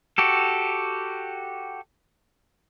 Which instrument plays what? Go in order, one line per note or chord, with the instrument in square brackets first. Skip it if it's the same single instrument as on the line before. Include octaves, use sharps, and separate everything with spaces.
[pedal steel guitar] F#4 G4 A4